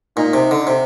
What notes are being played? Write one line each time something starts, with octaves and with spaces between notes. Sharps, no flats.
A#2 D#4
C3
D3
C3